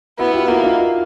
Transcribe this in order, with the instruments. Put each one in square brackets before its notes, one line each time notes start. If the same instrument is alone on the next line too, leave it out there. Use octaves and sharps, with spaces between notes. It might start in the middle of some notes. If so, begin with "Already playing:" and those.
[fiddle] B3 [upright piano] E4 F#4
[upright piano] F4 G4
[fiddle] A#3 [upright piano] E4 F#4
[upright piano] D#4 F4